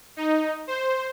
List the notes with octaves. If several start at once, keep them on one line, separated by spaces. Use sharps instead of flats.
D#4
C5